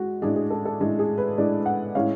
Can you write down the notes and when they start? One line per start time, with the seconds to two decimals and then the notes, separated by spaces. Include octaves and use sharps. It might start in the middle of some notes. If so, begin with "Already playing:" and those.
Already playing: G#3 F#4
0.22 A2 G#3 D4 G#4
0.36 G#4
0.50 A4
0.65 A4
0.79 A2 G#3 D4
0.99 G#4
1.18 B4
1.38 A2 G#3 D4 D5
1.66 F#5
1.95 A2 G#3 C#4 F5